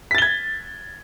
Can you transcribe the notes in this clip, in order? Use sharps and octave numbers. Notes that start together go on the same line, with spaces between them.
G#6 A6 B6 G7